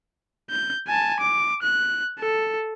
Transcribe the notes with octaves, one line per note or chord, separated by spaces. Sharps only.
G6
G#5 A5
D6
F#6
A4